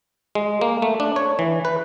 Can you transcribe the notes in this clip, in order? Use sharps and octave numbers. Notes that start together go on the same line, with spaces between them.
G#3
A#3
A3
D4
C#5
E3
B4